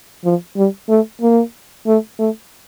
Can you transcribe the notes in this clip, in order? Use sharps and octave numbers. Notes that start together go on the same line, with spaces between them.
F3
G3
A3
A#3
A3
A3